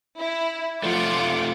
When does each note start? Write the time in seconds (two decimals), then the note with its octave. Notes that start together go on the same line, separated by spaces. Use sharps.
0.19 E4
0.83 F3 A3 F4 F#5 D6